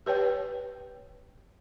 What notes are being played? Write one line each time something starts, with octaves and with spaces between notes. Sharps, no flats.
G4 B4 C#5 G5